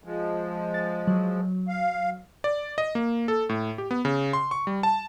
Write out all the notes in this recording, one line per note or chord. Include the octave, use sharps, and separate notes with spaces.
F3 G#3
A6
F#3
F5
D5
D#5
A#3
A4
A2
G4
B3
C#3
C6
C#6
G3
A5